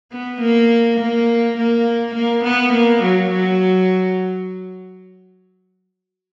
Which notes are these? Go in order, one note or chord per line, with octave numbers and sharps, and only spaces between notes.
B3
A#3
A#3
A#3
A#3
B3
A#3
F#3
F#3